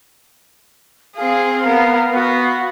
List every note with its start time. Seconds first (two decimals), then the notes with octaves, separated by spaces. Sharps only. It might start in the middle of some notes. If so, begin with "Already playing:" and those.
1.16 C4 G#4 F5
1.66 B3 A#4
2.13 B3 F#4